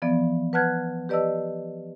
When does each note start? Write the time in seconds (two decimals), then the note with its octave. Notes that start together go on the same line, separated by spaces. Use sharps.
0.02 E3 F3 B3 D5
0.53 B4 F#5 A5 F6 F#6 G#6
1.09 G4 B4 D5 D#5 A5 E6